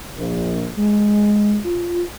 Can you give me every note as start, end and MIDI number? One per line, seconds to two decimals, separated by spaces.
0.17 0.69 34
0.78 1.56 56
1.65 2.02 65